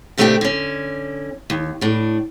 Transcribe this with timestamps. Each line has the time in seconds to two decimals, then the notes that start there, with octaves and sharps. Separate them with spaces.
0.18 A#2 C#3 A3 C4 D4 G4
0.41 D3 C#4
1.50 D#2
1.81 A2 D4